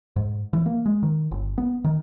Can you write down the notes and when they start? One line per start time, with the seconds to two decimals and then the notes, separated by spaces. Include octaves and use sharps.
0.16 G#2
0.53 E3
0.66 A#3
0.86 G#3
1.03 D#3
1.31 G1
1.58 B3
1.84 D#3